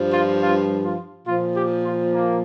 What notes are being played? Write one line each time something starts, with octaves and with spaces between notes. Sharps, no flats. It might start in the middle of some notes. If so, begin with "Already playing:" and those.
Already playing: G2 F3
F4
F4
F4
A#2 F3 F4
G4
F4
A#3